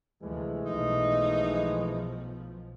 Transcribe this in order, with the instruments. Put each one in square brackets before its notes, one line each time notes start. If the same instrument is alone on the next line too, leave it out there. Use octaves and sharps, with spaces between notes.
[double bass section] D2 C3 F3 [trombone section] E3 G#3 A3
[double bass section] B1 B2 F3 [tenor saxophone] D#4